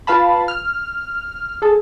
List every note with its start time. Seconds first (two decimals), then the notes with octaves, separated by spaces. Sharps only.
0.07 F4 B4 F5 A5 B5
0.48 F6
1.62 G#4 A4